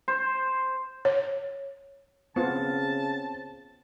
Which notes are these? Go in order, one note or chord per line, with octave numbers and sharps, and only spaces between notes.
C5
C#5
C#3 B3 C4 F4 A5